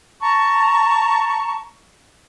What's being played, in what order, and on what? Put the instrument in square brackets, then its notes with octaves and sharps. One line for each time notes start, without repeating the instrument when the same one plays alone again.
[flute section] A5 A#5 C#6